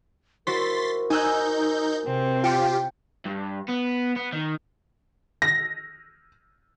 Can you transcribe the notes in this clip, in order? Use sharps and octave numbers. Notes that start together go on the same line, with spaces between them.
E4 F#4 A#4 C5 C6 A6 B6
D#4 G#5 E6 F#6 G6
C3 C4
F4 G4 G5 C#7
G2
B3
B3
D#3
A#6